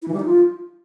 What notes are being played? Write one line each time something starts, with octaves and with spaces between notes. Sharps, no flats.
E4
E3
G3
D#4
F4